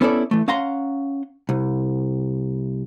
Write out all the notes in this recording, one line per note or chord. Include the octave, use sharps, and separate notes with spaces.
B3 C#4 E4 A4 C5 D5
E3 A3
C#4 F5 F#5 A#5 C6
C2